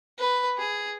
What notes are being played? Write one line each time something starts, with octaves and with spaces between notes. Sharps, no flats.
B4
G#4